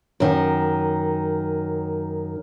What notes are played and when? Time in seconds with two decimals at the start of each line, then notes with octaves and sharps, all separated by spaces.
0.20 F#2 D#3